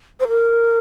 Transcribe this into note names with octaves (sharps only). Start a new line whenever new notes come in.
C5
A#4